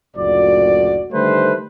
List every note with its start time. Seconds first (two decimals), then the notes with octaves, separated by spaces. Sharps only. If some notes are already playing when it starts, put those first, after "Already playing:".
0.17 F#1 D2 A#2 F#4 D5
1.12 D3 D#3 G3 A3 B4 C5